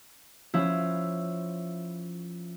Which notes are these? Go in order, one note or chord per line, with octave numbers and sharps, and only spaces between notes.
F3 C#4 E4